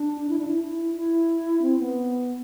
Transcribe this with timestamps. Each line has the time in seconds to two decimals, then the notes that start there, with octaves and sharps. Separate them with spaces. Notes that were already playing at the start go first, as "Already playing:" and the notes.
Already playing: D4
0.30 E4
0.39 D4
0.48 E4
0.63 E4
0.97 E4
1.62 C4
1.79 B3